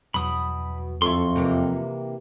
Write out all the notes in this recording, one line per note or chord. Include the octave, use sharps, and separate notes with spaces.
E2 B2 F#3 B5 D#6
F2 E4 A4 C6 C#6
C3 E3 A#3